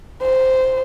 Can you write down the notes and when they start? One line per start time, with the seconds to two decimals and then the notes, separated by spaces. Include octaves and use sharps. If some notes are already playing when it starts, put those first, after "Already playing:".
0.22 C5